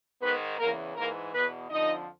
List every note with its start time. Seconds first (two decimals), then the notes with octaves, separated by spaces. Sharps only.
0.21 G#2 D#3 B3 B4
0.58 E2 C#3 E3 A#3 A#4
0.95 G#2 E3 A#3 A#4
1.32 E2 B2 B3 B4
1.70 F2 D3 F3 D#4 D#5